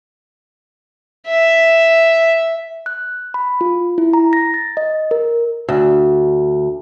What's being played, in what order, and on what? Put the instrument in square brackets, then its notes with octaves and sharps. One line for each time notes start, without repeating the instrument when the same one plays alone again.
[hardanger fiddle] E5
[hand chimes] F#6
B5
F4
E4
A#5
A#6
A6
D#5
A#4
[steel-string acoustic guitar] D2